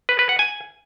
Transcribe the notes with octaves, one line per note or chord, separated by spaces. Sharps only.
B4
B4
F#5
G#5